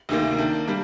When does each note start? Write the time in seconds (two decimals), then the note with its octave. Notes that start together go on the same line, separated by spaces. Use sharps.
0.09 D2 C3 D#3 A#3
0.38 D#3 A#3 D4
0.67 G3 A#3 D4